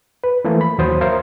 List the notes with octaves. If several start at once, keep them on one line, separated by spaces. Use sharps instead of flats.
B4
E3 F3 A3 A#3
B5
D#2 F#3 C5 D#6
A#4 C5 E5 F5